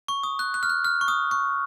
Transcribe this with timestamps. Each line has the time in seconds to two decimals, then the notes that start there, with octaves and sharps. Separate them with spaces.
0.08 C#6
0.23 D#6
0.39 F#6
0.54 F#6
0.63 F6
0.69 F#6
0.85 F6
1.01 C#6
1.08 D#6
1.31 C#6